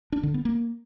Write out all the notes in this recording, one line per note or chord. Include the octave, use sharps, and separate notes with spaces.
D4
D3
B3
A#3